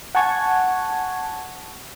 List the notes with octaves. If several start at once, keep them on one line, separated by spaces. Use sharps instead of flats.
F#5 G#5 A5 C#6 G#6